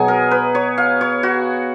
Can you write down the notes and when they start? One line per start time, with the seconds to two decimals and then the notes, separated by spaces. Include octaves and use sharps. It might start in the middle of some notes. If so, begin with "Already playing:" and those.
Already playing: B2 F#3 G#4 C#5 D#5
0.08 A#4
0.31 B4
0.55 C#5
0.78 F5
1.01 C#5
1.23 F#4